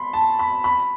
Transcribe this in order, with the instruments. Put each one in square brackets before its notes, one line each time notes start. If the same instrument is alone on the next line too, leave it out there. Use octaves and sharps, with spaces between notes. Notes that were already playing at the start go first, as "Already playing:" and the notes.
Already playing: [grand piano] B5 C6
A5
B5
B5